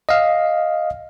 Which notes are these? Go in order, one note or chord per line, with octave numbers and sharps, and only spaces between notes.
D#5 F5